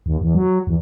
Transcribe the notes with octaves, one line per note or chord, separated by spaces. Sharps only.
D#2
E2
F#3
E2